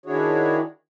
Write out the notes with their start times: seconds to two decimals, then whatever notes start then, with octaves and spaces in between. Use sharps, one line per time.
0.06 D#3 D4 E4 F#4 G#4 C#5